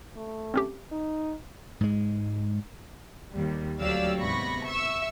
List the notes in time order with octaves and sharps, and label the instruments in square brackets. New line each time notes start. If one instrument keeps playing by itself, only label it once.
[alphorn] A3
[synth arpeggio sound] C4 C#4 G4
[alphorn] D#4
[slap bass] G#2 G#3
[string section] D#2 G3
D2 F#3 G4 D5 F5 E6
G#2 C3 B3 B5 C#6 A#6
E5 C#6 E6